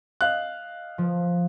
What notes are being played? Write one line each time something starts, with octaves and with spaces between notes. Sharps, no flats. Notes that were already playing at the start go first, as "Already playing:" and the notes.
D#5 F5 F#6
F3